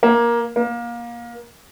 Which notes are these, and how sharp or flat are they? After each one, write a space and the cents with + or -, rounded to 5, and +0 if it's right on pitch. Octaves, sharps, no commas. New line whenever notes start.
A#3 +15
A#3 +25